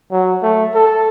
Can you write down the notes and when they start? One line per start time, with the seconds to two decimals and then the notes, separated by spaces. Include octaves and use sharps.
0.11 F#3
0.42 A3
0.74 A4